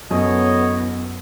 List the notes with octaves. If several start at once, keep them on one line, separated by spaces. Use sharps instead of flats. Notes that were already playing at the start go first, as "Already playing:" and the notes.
F#2 A2 B3 C#5 D#5